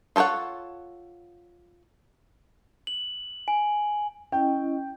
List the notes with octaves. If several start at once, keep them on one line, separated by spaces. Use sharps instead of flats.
F4 A4 C5 C#5 F#5
F#7
G#5
C#4 E4 D#5 G5